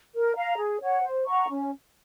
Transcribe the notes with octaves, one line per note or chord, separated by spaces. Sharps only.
A#4
F5 A#5
G#4
C#5 F#5
C5
F#5 A#5 C#6
C#4